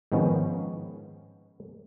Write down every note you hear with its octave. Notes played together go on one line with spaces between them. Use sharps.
G#2 D#3 F3 B3 C#4